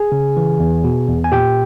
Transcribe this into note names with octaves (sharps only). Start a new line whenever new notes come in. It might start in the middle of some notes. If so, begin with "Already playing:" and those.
Already playing: G#4 G#5
C#3
E3
E2
B2
E2
G#5
A#2 G4 G5